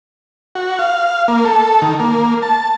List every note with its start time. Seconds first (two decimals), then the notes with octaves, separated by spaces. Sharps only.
0.55 F#4
0.79 F5
1.28 A#3
1.45 A4
1.82 D#3
2.00 A#3
2.42 A5